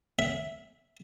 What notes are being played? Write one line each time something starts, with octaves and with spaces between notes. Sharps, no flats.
E5